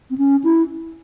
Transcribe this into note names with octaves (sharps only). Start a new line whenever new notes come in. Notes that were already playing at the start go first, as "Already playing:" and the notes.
C4
C#4
E4